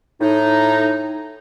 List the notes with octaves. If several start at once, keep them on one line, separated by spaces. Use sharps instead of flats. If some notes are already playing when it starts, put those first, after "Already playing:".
A2 D#4